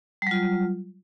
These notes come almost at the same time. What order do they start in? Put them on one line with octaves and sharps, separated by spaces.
G3 F#3 F4